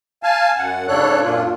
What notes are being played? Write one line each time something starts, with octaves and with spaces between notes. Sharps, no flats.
F5 G#5 A5
F#2 F#5
G#2 C#3 D4 A4 C#5 F#6
F#2 A#2 D4 F4